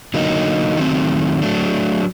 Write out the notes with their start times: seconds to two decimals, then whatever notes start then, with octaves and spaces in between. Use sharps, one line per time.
0.14 D3 F#3 A#3 D#4
0.77 D#3 F#3 A3 C4
1.41 F#3 A3 D4